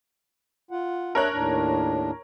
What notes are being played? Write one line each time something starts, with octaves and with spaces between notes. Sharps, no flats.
F4 F#5
D4 A#4 C#5 E5 F#6
D#2 A2 D4